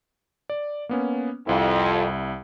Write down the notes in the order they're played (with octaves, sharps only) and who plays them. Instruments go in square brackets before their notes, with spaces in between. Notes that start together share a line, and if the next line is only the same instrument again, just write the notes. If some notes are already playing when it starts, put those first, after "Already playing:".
[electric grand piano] D5
A#3 B3 C#4
[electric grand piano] C2 E4 [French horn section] F2